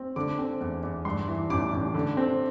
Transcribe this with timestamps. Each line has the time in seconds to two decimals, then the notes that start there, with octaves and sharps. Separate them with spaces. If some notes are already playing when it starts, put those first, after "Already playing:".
Already playing: C4
0.16 D3 D6
0.39 C4
0.61 E2
0.83 E2
1.05 G2 C6
1.28 E3
1.50 A1 D6
1.73 A1
1.94 D3
2.17 C4